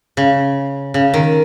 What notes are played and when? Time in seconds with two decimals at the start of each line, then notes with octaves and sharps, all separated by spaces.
0.17 C#3
0.94 C#3
1.14 D#3